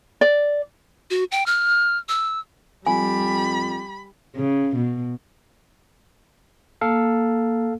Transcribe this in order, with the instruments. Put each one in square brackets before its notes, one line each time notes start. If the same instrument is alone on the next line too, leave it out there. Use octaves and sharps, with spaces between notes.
[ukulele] D5
[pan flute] F#4
G5
F6
E6
[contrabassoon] F2 [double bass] G3 [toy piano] G#5 [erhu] B5
[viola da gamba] C#3
B2
[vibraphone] A#3 [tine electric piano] A4 F5